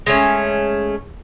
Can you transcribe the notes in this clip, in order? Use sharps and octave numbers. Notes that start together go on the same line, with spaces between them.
G#3 A3 C#4